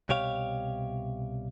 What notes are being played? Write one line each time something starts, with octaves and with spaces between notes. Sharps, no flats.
C2 B2 G4 C#5 F5